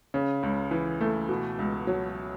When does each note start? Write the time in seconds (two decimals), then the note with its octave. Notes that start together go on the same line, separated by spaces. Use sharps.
0.14 C#3
0.43 C#2
0.71 E3
1.01 A3
1.29 B2
1.59 C#2
1.87 F#3